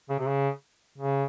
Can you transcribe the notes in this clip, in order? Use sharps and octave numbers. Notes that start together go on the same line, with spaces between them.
C#3
C3
C#3
C#3